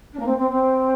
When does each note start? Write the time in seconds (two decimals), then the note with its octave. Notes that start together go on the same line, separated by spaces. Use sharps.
0.13 D4
0.19 A#3
0.26 C4
0.38 C4
0.50 C4